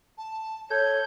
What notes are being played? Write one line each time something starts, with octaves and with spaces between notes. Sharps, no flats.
A5
A4 C#5 G6 G#6